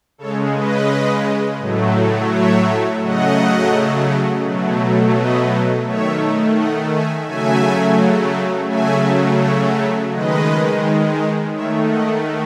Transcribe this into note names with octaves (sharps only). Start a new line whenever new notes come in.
C#3 G#3 A4 C#5
B4 D#5
A2 F#3 A3
C#5 E5
C#3 F#3 A3 D#5 F#5
B2 F#3 A3
B4 D#5
D#3 A3 C#5 E5
D#5 F#5
E5 G#5
C#3 F#3 A3 E5 G#5
C#3 F#3 A3 E5 G#5
C#5 E5
D#3 G#3 B4 D#5
D#3 A3 C#5 E5
D#5 F#5